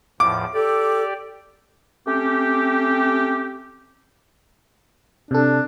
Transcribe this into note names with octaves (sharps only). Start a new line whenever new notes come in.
E2 A2 F3 D6
G4 A4 D5
A3 C4 C#4 G4
C3 D4 A4